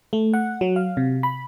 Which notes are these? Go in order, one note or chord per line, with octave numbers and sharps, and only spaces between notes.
A3
F#5
F#3
F5
C3
B5